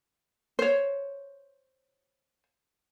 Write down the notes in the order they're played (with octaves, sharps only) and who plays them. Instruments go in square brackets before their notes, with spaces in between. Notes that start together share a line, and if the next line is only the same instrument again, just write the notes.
[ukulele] C5 C#5